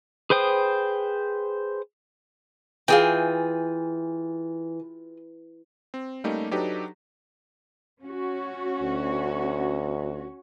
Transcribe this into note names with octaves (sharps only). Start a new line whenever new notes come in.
G#4 B4 C5 G5 D#6
E3 F4 G#4 G5
C4
G3 A3 A#3 C#4 D#4 G4
F#3 D4 D#4 G4 A4 B4
C#4 F#4
D2